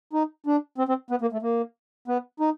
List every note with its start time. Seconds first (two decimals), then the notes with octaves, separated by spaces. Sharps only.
0.13 D#4
0.47 D4
0.78 C4
0.89 C4
1.11 B3
1.22 A#3
1.33 A3
1.42 A#3
2.08 B3
2.40 D#4